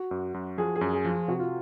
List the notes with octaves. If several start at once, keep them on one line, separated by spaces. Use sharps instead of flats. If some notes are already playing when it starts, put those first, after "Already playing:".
Already playing: F#4
F#2
F#2
F3 G#4
G#4
F#2
G#4
F3
F4
C3 F#4
F4